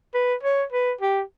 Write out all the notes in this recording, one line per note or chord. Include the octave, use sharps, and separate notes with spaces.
B4
C#5
B4
G4